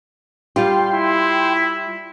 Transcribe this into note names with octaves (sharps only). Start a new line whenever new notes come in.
G3 F4 G4 G5 C6
E4